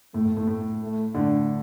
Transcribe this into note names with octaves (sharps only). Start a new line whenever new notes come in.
A2 A3
A2
A2
A2
A3
A2 D3 D4